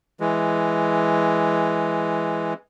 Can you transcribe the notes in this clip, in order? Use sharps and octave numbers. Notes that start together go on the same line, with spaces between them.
E3 G#3